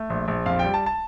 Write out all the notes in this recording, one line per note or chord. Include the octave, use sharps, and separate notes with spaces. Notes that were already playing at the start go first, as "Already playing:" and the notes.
Already playing: A3
A#1
A#1
F2 F5
G5
G3
A5
A5